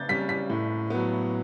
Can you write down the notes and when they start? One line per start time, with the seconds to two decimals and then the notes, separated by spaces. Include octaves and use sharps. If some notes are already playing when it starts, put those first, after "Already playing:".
Already playing: C#3 G6 A6
0.09 G3 C#4 B6
0.29 B6
0.50 A2
0.90 F#3 B3